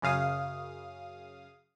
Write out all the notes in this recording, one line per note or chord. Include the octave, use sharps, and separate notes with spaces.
F#2 C#3 F5 D#6